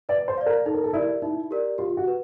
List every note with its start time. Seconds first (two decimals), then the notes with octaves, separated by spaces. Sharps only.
0.09 B4 D5
0.28 C5
0.38 D5 F5
0.46 A#4
0.66 D#4 A4
0.74 A#4
0.84 A4
0.93 E4 G4 A#4 D5
1.22 D#4 E4
1.51 G4 A#4 D5
1.78 F4 G4
1.97 F#4
2.07 B4